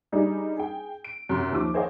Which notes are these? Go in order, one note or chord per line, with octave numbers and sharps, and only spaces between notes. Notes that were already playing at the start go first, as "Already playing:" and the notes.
G3 D4 D#4 G#4
G#4 G5
D7
F#2 C3 C6
D#2 F3 D6
G#4 C5 C#5 D#5 F5 G5